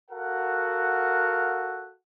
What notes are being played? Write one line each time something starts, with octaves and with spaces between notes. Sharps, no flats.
F#4 A4 A#4 F5 F#5